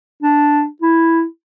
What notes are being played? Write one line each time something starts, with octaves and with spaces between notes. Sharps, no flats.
D4
E4